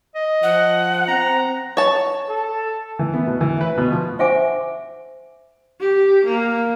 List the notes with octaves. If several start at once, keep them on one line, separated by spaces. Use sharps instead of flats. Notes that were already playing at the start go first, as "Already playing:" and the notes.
D#5
F3 F#5
C4 A#5
C#5 A5
A4
E3
B3
B2
E3
B4
B2
F3
C5 C#5 E5 F#5 G#5 D6
G4
A#3